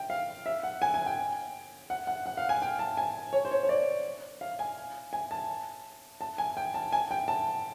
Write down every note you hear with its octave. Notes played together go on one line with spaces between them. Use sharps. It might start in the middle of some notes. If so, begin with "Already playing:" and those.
Already playing: G5
F5
E5
F#5
G#5
G#5
G5
F#5
F#5
F#5
F5
G#5
G5
A5
G#5
C#5
C5
C#5
C#5
D5
F5
G#5
G#5
A5
A5
G#5
G5
A5
G#5
G5
A5